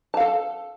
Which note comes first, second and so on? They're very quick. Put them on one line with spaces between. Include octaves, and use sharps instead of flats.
A5 F5 A4